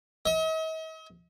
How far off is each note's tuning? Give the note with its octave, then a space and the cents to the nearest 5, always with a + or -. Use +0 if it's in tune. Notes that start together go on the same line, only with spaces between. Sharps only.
D#5 +45